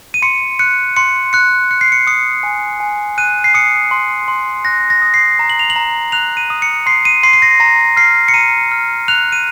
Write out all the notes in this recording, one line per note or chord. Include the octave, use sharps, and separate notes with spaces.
D#7
C6 C#7
F#6 C#7
C6 C#7
F#6 C#7
F#6 C#7
C7
C#7
D#6 C#7
G#5
G#5
F#6 D#7
C7
D#6 C#7
C6
C6
F#6 A#6
A#6
D#6
C7
A#5
F#7
F7
F#7
A#5
F#6 F7
D#7
D#6
C#7
C6 C7
D#7
C6 C7
C7
A#6
A#5 A#6
F6 C7
C#7
A#5 D#7
F6
F#6 F7
D#7